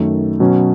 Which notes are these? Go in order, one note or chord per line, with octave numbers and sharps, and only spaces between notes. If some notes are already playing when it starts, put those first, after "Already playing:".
Already playing: F#2 D#3 A3
B2 F#3 C#4